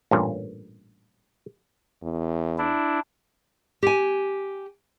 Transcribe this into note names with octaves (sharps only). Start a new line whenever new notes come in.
A1 G2 A#2
E2
D4 E4
G4 G#5